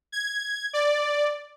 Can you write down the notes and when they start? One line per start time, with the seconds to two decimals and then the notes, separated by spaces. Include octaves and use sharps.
0.12 G#6
0.73 D5